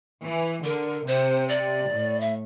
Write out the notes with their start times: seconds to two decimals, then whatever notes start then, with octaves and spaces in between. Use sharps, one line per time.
0.23 E3
0.64 D3 A#4
1.06 C3 C5
1.49 D5
1.91 A2
2.21 E5